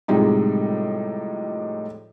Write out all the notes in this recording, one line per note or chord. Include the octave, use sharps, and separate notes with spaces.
A2 C3 F3 G3 G#3 D#4